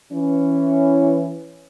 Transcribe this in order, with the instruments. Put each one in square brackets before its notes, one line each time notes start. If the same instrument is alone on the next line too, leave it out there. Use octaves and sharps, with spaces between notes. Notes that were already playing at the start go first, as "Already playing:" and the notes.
[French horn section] E3 C#4